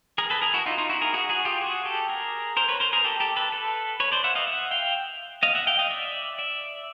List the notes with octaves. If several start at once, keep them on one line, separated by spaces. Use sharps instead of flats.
G#4 A#4
A4 B4
G#4 A#4
E4 F#4
D#4 F4
D#4 F4
E4 F#4
G#4 A#4
F#4 G#4
F#4 G#4
F4 G4
F#4 G#4
G4 A4
G#4 A#4
A#4 C5
B4 C#5
A#4 C5
G#4 A#4
G4 A4
G4 A4
A4 B4
A4 B4
B4 C#5
C5 D5
E5 F#5
D#5 F5
E5 F#5
F5 G5
D#5 F5
E5 F#5
F5 G5
D#5 F5
D5 E5
D5 E5